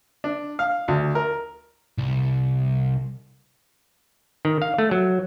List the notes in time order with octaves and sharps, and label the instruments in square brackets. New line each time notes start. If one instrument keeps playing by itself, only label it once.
[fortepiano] D4
F5
D2
A#4
[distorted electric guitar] C2
[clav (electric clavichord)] D#3
F5
A3
F#3